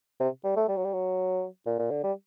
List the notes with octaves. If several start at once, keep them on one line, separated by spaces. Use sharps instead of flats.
C3
G3
A3
G3
F#3
G3
F#3
A#2
A#2
D3
G3